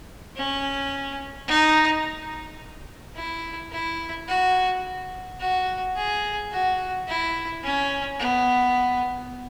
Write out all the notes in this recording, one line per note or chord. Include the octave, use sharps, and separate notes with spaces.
C#4
D#4
E4
E4
F#4
F#4
G#4
F#4
E4
C#4
B3